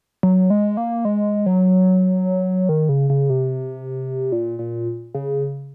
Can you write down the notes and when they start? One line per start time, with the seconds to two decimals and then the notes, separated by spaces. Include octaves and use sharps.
0.23 F#3
0.50 G#3
0.77 A#3
1.05 G#3
1.46 F#3
2.69 D#3
2.89 C#3
3.10 C#3
3.30 C3
4.32 A#2
4.59 A#2
5.15 C#3